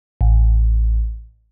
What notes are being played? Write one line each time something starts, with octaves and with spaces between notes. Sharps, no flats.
A1